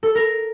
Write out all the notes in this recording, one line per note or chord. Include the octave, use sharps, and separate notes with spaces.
A4
A#4